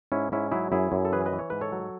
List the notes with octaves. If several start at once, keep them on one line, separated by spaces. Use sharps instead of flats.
G#2 C#4 E4
G#2 C#4 E4
F#3 E4 G#4
F#2 E4 G#4
F#2
A4
E3 G#4 B4
B4 D#5
E3
C#5
G#2 B4
A4 C#5
F#3